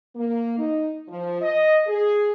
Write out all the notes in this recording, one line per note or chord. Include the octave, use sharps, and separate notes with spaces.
A#3
D#4
F3
D#5
G#4